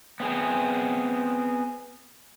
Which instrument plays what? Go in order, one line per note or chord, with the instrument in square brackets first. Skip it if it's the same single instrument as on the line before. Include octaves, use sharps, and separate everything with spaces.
[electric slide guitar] B3 C4 G#4